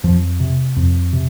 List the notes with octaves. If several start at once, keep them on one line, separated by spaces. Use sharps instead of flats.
F2 F3
C3
F2
C3